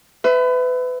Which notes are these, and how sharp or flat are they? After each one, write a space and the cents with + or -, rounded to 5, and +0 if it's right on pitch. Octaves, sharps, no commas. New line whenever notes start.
B4 +30 E5 +0